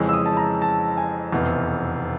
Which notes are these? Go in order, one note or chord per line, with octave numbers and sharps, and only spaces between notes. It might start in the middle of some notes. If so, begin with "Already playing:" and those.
Already playing: F2 C#3 E3 G#3 C#4
E6
D#6
A5
A#5
A5
G#5
F1 E2 B2